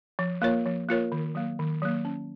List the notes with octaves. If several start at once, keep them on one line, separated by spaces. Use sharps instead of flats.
F3
A#3 F4 A#4 C#5
F3
A#3 F4 A#4 C#5
D#3
F#3 A#3
D#3
F#3 A#3
C#4